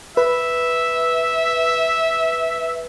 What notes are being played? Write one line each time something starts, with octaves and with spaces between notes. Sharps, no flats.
B4 E5